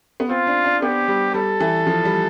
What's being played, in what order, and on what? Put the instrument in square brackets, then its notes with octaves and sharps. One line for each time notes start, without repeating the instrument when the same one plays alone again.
[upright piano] B3
[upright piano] C4 [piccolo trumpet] F4
[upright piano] D4
D4
[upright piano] B3 [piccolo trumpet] G4
[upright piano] G3
[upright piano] G3 [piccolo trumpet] A4
[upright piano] E3
F3
G3